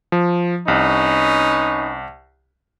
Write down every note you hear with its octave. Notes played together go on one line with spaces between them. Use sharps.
F3
C2 C#4 D#4 B4